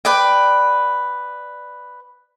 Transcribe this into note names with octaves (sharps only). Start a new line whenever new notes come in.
B4 D5 G5